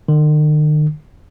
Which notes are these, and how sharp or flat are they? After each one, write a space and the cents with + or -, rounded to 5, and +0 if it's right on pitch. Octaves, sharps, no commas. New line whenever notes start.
D#3 -45